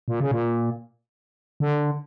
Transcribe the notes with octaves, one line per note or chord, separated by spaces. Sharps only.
A#2
C#3
A#2
D3